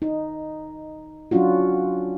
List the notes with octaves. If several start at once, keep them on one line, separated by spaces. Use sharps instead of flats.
D#4
F#3 C#4 D4 F4 F#4